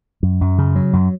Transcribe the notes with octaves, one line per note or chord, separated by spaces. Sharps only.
F#2
F#2
C#3
F#3
F#2